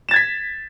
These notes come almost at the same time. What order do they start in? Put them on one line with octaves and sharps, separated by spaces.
E7 A6 G#6 B6